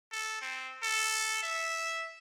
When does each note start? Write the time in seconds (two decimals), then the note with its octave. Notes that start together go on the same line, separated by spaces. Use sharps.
0.12 A4
0.41 C4
0.83 A4
1.43 E5